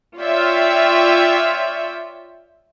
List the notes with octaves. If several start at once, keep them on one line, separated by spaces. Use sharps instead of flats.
F4 C#5 D5 E5 G5